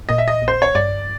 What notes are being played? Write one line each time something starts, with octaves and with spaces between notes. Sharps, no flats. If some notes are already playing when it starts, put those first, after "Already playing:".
Already playing: G#1
A#2 D#5
E5
D#5
A#1
C5
C#5
G2 D5